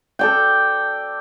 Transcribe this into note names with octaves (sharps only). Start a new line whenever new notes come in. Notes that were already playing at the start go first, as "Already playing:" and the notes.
A4 D5 G5